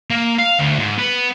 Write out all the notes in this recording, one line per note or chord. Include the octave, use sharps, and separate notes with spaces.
A#3
F5
D2
G#2
B3